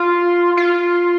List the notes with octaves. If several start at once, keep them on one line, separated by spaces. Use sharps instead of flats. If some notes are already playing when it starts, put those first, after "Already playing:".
Already playing: F4
F4